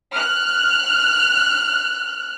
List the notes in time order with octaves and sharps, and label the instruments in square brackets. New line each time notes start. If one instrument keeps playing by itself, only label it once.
[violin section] F6 F#6